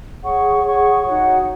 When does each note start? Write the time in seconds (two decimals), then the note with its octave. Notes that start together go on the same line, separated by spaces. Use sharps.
0.22 G#4 C#5 F#5 C#6
0.63 G#4 C#5 F#5 C#6
1.03 D#4 F#4 C#5 F#5